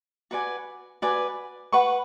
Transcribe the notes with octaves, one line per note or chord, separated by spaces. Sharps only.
F#4 B4 D5 G#5
F#4 B4 D5 G#5
B4 F#5 C#6